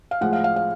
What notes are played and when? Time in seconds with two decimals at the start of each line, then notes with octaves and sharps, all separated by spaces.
0.11 F5
0.21 A2 F3 G#3 F#5
0.33 F5
0.44 F5
0.56 F5